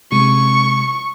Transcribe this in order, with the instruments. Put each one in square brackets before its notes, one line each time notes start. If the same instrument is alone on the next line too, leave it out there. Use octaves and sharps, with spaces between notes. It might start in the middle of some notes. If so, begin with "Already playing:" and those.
[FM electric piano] C3 G#3 [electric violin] C#6